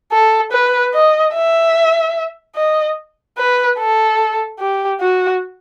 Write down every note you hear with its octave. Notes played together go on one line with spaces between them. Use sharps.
A4
B4
D#5
E5
D#5
B4
A4
G4
F#4